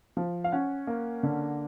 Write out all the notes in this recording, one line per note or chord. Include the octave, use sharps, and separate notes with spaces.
F3
F5
C#4 F#5
A#3
D3